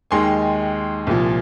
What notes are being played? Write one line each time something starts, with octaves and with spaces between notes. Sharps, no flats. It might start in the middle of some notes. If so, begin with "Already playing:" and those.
D#2 D#3 G#3 D#4 G#5 C6
C2 A#2 F3